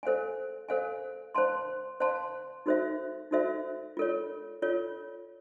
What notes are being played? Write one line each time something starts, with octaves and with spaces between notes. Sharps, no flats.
A4 C5 F5 G#5
A4 C5 F5 G#5
C5 F5 A5 C6
C5 F5 A5 C6
D#4 F#4 A4 C5 E5
D#4 F#4 A4 C5 E5
F4 A4 C#5
F4 A4 C#5